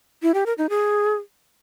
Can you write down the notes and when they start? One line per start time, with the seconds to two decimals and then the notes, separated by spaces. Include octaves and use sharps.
0.22 E4
0.34 G4
0.46 A#4
0.58 D#4
0.70 G#4